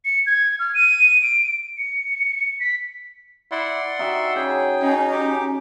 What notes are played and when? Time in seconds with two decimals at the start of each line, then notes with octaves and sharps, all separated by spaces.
0.05 C#7
0.27 G#6
0.59 F6
0.75 D#7
1.23 D7
1.78 C#7
2.60 B6
3.51 E4 D5 F#5 C6
3.99 D#4 F#4 E5 G5
4.36 C#3 G#4 G5
4.82 C#4 D#4
5.13 G4 D6